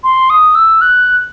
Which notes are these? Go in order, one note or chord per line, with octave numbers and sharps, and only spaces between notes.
C6
D#6
E6
F#6